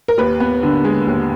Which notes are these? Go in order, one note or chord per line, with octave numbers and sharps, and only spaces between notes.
A#4
D#2 B4
B3
D3
G#3
D#2